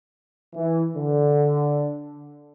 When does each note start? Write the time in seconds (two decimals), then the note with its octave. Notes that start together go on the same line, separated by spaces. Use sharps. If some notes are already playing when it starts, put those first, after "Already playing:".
0.55 E3
0.97 D3